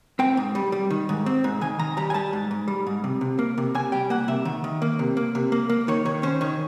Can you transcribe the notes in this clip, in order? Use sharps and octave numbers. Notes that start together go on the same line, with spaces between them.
C4 G5
G#2
G3
G3
D#3
G#2
C4
G#2
D#3 G#5
D#3 A#5
G3 A#5
G#5
G3 A5
G#2
G#2
G3
G#2
C3
C3
A#3
C3
C3 G#5
G3 G5
A#3 F#5
C3 E5
D#3
D#3
A#3
C3
A#3
C3
A#3
A#3
D#3 C#5
D#3 C#5
C#4 C5
D#3 C#5